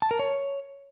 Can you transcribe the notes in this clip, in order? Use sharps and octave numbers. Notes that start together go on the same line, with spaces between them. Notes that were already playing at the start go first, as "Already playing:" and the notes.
A5
A#4
C#5